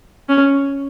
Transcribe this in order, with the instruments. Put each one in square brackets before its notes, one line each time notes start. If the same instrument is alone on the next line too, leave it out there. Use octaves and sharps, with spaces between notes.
[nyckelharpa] C#4